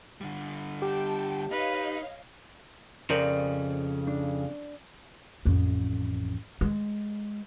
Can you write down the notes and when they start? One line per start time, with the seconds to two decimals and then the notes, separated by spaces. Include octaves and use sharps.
0.21 D3 G3
0.82 G4 G5 A5
1.51 D#4 B4 C#5 D#5 F5
3.10 F2 C#3 A#4 C5 D5
4.07 D4
5.45 A1 F2
6.61 G#3